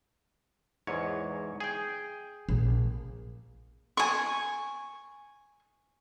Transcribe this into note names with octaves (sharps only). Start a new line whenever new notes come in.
E2 G#2 C#5
G#4 G5
A#1
G#5 C#6